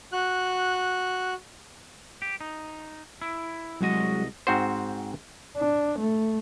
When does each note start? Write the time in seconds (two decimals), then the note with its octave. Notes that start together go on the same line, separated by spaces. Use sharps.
0.13 F#4 F#6
2.22 G4
2.41 D#4
3.22 E4
3.81 C2 F#3 G#3 F#4 D#5
4.47 G#2 C4 F#4 C5
5.57 D4
5.99 A3